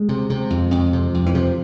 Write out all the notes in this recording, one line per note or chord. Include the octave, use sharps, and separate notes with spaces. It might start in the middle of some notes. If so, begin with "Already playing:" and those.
Already playing: G#3
C3
C3
F2
F2
C3
F2
E3
C3 F3